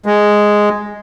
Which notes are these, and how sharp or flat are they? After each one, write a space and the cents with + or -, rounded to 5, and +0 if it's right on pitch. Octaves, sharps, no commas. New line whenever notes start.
G#3 +0